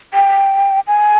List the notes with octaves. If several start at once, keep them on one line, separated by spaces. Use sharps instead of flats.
G5
G#5